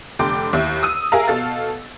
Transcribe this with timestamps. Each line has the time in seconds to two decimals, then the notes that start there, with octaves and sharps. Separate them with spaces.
0.19 F1 D3 G5 C6 D6
0.53 D#2 E4
0.83 D#6 E6 D#7
1.12 G#4 A#4 E5 F5 A#5
1.28 B2 A4 F5 A6